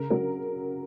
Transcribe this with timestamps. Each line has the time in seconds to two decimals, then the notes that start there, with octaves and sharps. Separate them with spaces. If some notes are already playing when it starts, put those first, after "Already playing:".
Already playing: C#3 A#4
0.10 F#3 A#4